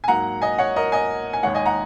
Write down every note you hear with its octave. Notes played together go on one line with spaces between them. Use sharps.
G#5
G#2 F#3 A#3 F#5 A#5
D#5 G#5
C#5 F#5
A#4 D#5
D#5 G#5
G#5
D#2 D#3 G#3 C#5 F#5
D#5 G#5
F#5 A#5